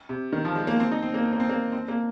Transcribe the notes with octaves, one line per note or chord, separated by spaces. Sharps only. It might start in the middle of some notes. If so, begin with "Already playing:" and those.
C3
D#3
F3
G#3
A#3
C4
D#4
C4
A#3
C4
A#3
C4
A#3
C4
A#3